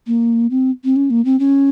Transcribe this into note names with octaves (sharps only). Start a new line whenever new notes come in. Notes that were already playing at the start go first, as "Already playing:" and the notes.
A#3
C4
C4
C#4
A#3
C4
C#4